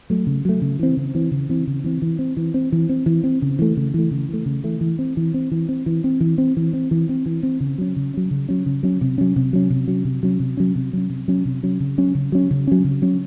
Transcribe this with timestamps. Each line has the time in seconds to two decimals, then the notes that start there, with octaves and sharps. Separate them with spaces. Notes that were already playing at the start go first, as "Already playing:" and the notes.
0.10 F#3 A3
0.27 C#3
0.45 F#3 A3
0.62 C#3
0.79 E3 C4
0.97 C#3
1.15 E3 C4
1.32 C#3
1.49 E3 C4
1.67 C#3
1.84 E3 C4
2.02 E3
2.19 C4
2.37 E3
2.54 C4
2.72 E3
2.89 C4
3.06 E3
3.24 C4
3.42 C#3
3.59 E3 A3
3.77 C#3
3.94 E3 A3
4.11 C#3
4.29 E3 A3
4.46 C#3
4.64 E3 A3
4.81 E3
4.99 C4
5.17 E3
5.34 C4
5.52 E3
5.69 C4
5.86 E3
6.04 C4
6.21 E3
6.38 C4
6.57 E3
6.73 C4
6.91 E3
7.09 C4
7.26 E3
7.43 C4
7.60 C#3
7.78 F#3 C#4
7.96 C#3
8.14 F#3 C#4
8.31 C#3
8.49 F#3 C#4
8.66 C#3
8.83 F#3 C#4
9.01 C3
9.18 F#3 C#4
9.36 C3
9.53 F#3 C#4
9.70 C3
9.88 F#3 C#4
10.05 C3
10.23 F#3 C#4
10.40 C3
10.57 F#3 C#4
10.76 C3
10.93 F#3 C#4
11.10 C3
11.28 F#3 C#4
11.45 C3
11.63 F#3 C#4
11.80 C#3
11.98 F#3 C#4
12.15 C#3
12.32 F#3 C#4
12.51 C#3
12.67 F#3 C#4
12.85 C#3
13.02 F#3 C#4